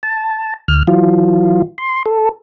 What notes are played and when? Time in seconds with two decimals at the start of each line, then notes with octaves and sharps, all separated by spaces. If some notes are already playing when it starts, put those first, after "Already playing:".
0.03 A5
0.68 D2 F6
0.87 E3 F#3 F4
1.78 C6
2.06 A4